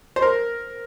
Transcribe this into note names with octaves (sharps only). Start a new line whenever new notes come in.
C5
A#4